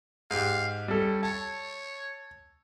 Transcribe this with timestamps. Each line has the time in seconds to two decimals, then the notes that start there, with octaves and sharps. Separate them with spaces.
0.31 G#2 G4 F5
0.88 G3 C#4 A4
1.23 C#5 A5